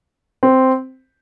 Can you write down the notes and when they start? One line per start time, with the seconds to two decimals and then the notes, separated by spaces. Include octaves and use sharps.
0.43 C4